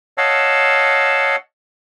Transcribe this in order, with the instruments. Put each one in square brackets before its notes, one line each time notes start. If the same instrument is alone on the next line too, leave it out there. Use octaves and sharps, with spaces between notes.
[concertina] C#5 D#5 F5 F#5 A5 E6